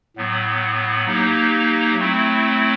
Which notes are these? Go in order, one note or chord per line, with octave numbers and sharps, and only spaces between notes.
A2 F#3 B3
F#3 A#3 D#4 G4
F#3 A3 C4 E4